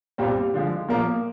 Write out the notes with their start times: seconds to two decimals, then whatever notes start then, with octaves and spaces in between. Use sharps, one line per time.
0.18 C2 A#2 G3 C4
0.54 D3 F3 G#3
0.89 A#2 F3 A#3